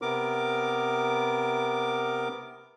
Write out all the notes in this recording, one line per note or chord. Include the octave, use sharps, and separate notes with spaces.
C3 B3 A#4 D6